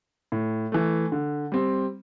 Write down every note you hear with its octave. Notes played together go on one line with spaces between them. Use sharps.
A2
E3 A3
D3
G3 C4